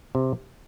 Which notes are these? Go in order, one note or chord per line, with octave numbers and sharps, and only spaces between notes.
C3